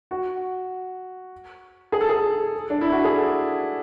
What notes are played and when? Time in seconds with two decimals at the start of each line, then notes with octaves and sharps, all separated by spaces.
0.11 F#4
1.92 G#4
2.01 A4
2.09 G#4
2.70 D4
2.81 E4
2.92 F#4
3.04 G#4
3.15 A4